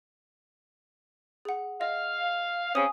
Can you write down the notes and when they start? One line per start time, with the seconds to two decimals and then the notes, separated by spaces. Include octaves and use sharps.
1.45 G#4 F#5
1.81 D#5 F5
2.75 C#3 C4 C#4 G#5 D#6